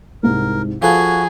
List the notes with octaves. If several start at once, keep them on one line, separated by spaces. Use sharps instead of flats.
C2 G#2 A#4
F3 F#4 G#4 A4 B4 F5 A5